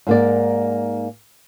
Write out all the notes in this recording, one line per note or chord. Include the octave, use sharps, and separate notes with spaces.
G#2 A#3 D5